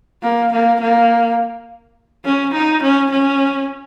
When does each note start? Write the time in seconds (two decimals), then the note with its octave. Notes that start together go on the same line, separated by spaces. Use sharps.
0.23 A#3
0.53 A#3
0.81 A#3
2.25 C#4
2.54 D#4
2.83 C#4
3.11 C#4